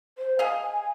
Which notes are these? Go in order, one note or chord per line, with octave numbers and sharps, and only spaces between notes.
C5
G#4 D#5 F5 G#5